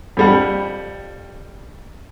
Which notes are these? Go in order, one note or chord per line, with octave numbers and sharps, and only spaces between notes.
F2 G3 F#5